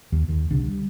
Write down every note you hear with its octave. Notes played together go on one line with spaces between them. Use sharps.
D#2
D#2
C2 D3
G3